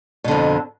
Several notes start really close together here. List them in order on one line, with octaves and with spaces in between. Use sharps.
B2 D3 F2